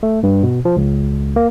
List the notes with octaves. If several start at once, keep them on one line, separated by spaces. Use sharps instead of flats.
A3
G2
B2
F3
C#2
A#3